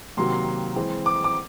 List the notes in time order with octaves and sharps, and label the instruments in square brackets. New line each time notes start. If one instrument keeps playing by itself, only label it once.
[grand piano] C3 D#3 F#3 A#3 C6
C6
E3 G#3 C4
D6
D6